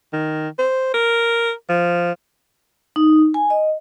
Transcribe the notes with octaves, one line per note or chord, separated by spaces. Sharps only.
D#3
C5
A#4
F3
D#4
G#5
D#5